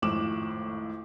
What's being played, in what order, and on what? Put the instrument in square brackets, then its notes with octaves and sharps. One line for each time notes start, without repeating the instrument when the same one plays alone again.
[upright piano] G#1 F2 A2 D6 E7 F#7